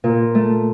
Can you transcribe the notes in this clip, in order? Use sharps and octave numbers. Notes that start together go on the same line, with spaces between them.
A#2
A3